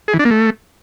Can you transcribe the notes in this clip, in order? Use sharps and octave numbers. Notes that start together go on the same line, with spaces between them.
G#4
E3
D4
A#3
A3